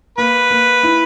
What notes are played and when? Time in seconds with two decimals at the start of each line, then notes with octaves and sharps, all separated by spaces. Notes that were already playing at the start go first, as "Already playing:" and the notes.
0.18 A#3 B4
0.51 A#3
0.83 E4